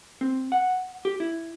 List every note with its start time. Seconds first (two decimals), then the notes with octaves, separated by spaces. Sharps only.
0.21 C4
0.52 F#5
1.05 G4
1.20 E4